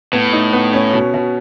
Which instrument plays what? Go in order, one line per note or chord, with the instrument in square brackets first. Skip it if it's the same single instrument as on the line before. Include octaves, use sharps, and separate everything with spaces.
[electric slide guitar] A2 [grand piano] B3
[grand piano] D#4
B3
C#4
B2
B2